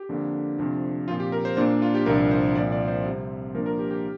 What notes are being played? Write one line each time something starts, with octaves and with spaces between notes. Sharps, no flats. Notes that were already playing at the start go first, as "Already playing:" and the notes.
Already playing: G4
F2 D3 A#3 D4
F2 C3 F3 D4
A#2 F3 C4 F4
G4
A#4
C5
A#2 A#3 D4 C5
F4
G4
C2 A#2 F3 D4 A#4
C5
C2 A#2 F3 D5
D5
C5
C3 G3 C4
A#2 F3 A#3 D4 A#4
A#4
G4
G4